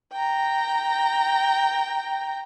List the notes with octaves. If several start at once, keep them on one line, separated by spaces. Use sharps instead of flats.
G5 A#5